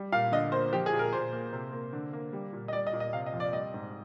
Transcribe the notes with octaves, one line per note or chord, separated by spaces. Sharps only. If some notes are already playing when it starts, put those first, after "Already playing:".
Already playing: G3
A#2 F5
D3 D#5
A#3 C5
F3 G4
G#4
A#2
A#4
A#2 C5
A#3
C3
A#3
D3
A#3
G3
A#2
D#5
G3 D5
D#5
A#2
D#5
C3 F5
D#5
F2
D5
G3 D#5
G#2